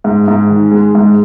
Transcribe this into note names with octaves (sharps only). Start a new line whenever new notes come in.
G#2
G#2
D#3
G#3
G#2